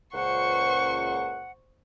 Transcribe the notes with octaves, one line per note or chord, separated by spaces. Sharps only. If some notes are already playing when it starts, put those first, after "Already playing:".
C#2 A#2 C5 F#5 C#6